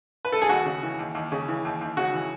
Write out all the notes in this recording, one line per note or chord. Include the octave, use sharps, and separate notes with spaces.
B4
A4
G#4
D#2 F#4
C#3
E3
D#2
D#2
C#3
E3
D#2
D#2
C#3 F#4
E3